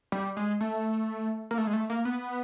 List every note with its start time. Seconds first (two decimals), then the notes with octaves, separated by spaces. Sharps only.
0.12 G3
0.37 G#3
0.61 A3
1.51 A#3
1.58 A3
1.67 G#3
1.73 A3
1.90 A#3
2.05 B3